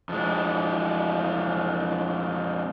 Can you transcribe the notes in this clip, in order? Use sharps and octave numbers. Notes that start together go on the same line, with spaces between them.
F2 G#3